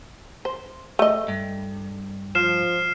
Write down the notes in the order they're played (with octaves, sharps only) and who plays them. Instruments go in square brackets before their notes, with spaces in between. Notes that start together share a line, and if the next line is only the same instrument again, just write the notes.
[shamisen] C5
A3 D#5
[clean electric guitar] G2
[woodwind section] F3 [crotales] F6 C7 E7